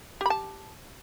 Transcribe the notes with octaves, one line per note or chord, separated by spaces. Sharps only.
G4 A5 B5